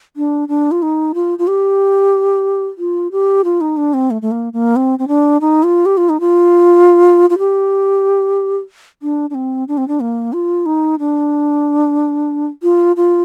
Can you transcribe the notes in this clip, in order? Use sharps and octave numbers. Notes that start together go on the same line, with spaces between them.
D4
D4
F4
D#4
F4
F4
G4
F4
G4
F4
D#4
D4
C4
A3
A3
A#3
A#3
C4
C4
D4
D#4
F4
G4
F4
D#4
F4
F4
G4
D4
D4
C4
D4
C4
D4
A#3
F4
D#4
D4
F4
F4